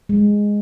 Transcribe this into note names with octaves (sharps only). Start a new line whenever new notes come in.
G#3